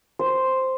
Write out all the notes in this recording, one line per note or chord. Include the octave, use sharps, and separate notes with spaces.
C5